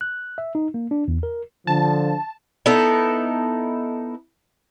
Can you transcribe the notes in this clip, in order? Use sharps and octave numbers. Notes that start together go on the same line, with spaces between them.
F#6
E5
D#4
A#3
D4
E2
A#4
D3 F3 A5
B3 D#4 E4 A4